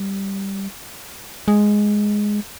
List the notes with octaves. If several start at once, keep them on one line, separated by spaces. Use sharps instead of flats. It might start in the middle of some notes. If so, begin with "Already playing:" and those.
Already playing: G3
G#3